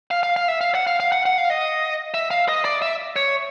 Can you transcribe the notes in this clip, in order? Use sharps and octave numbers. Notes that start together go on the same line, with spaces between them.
F5
F5
F5
E5
F5
F#5
F5
F5
F#5
F#5
F5
D#5
E5
F5
D#5
D5
E5
C#5